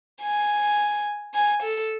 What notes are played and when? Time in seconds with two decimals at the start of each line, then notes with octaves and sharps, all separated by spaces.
0.23 G#5
1.34 G#5
1.63 A4